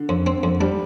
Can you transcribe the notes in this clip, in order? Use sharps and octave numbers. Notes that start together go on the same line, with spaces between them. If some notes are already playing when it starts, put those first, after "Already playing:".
Already playing: D3
F2
C4
F2
G3 D4